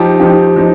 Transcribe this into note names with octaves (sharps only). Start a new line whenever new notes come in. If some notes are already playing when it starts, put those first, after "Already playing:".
Already playing: F3 D#4 G4
F3 D#4 G4
F3 D#4